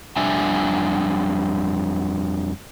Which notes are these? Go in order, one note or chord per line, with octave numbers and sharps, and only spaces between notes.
F2 G3 D4 E5 G#5